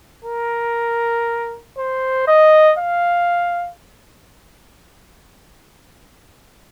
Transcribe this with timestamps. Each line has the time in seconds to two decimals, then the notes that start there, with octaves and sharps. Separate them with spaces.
0.25 A#4
1.77 C5
2.27 D#5
2.79 F5